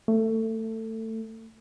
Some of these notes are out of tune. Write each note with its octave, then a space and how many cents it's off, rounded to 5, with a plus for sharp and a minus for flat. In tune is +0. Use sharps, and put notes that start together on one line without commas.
A3 +20